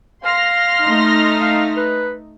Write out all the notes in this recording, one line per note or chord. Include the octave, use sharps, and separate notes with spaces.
F5 C6 F6 A#6
A3 D#4
F5
B4